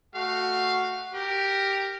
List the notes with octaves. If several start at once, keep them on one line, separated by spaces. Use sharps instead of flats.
A3 F#4 F5
G4 A#4